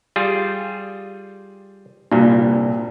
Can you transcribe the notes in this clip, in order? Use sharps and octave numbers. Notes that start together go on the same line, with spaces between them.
G3 F4 G#4
C2 G2 A#2